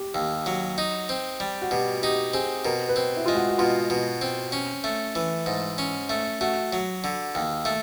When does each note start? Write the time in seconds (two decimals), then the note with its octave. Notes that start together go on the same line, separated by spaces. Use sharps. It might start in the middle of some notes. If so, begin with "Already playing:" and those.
Already playing: G4
0.15 D#2
0.46 F#3
0.78 D#4
1.09 C4
1.40 G3
1.62 F#4
1.71 B2 G4
2.03 D#4 G4
2.34 C4 G#4
2.65 B2 A#4
2.89 B4
2.96 C4
3.17 E4
3.26 G#3 F4
3.35 F#4
3.49 F#4
3.59 B2 F4
3.90 B2
4.21 C4
4.52 C#4
4.84 A3
5.15 E3
5.46 G#2
5.78 C#4
6.09 A3
6.41 A3 F#4
6.73 F#3
7.04 D3
7.35 D#2
7.65 A3